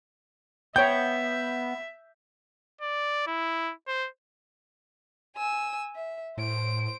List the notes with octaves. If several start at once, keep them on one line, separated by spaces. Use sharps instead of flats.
B3 C#5 E5 G5 G6
D5
E4
C5
G#5 E6
E5
A2 C5 D7